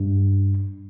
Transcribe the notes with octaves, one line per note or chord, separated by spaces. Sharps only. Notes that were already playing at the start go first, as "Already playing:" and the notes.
Already playing: G2